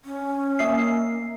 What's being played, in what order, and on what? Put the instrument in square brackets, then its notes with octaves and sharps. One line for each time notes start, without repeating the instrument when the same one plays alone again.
[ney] C#4
[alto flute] A#3 [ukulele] D#5 E5 [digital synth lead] C7